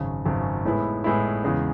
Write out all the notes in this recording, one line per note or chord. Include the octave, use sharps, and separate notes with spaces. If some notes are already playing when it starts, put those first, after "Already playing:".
Already playing: G#1 F#2 C#3
G#1 F#2 C#3
A2 G#3 B3 E4
A2 G#3 B3 E4
E2 C#3 G#3